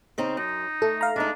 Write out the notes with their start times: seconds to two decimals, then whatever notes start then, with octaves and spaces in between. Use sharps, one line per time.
0.18 C#3 C4 D#4
0.37 F#2 D#4
0.82 A3 A4
1.01 F5 A#5
1.16 G#3 D4 D#4